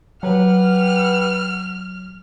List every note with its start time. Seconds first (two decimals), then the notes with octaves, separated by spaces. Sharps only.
0.23 F#3 G4 B4 F#5 F6